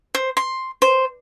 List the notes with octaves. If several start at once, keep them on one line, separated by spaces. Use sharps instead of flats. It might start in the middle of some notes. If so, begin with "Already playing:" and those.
C5
C6
C5